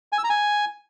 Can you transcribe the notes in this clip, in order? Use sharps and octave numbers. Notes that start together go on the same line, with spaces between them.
G#5
E6
A#5
G#5